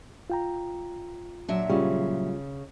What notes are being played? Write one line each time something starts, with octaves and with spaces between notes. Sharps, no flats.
F4 G5 A#5
A#2 F#3 D4 E5
C#3 G3 F4